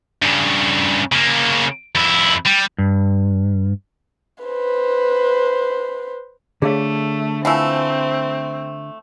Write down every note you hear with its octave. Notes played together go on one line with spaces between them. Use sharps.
G2 C#3
C#3 A#3
F2 E4
G3
G2
B4 C5
D3 A3 G#4 C#5 F5
E3 F3 A3 C4 F#5 G#5 E6